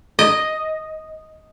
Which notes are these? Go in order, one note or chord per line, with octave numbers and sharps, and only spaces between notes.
D#5